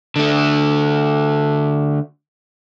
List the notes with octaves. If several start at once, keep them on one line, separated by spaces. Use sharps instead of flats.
D3 A3